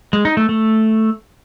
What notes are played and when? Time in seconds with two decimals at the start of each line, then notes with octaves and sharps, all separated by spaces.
0.13 G#3
0.25 D#4
0.37 A3
0.49 A3